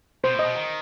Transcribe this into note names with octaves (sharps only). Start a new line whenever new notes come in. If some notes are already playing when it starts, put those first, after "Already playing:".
B2 C5
A2 D#5
B2
D#3